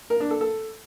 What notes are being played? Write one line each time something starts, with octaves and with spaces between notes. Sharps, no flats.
A#4
D4
A4
A4